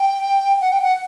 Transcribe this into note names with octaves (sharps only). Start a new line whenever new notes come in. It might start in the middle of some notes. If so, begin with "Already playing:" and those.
Already playing: G5
F#5
G5
F#5